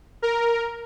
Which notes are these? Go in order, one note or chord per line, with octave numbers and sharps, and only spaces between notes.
A#4